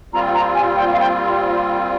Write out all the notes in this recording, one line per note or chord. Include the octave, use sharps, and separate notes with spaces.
A#2 G3 C4 F4 A#5
A#5
G#5
G5
F5
G5